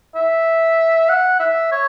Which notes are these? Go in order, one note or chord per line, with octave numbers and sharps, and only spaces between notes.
E5
F#5
E5
C#5